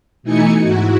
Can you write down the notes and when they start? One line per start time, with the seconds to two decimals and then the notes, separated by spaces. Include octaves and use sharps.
0.23 B2 E3 A3 D#4 G#5 C#7
0.60 G#2 E4 F#4